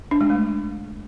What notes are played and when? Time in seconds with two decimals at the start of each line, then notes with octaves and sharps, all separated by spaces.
0.11 D4
0.21 G#3
0.30 A3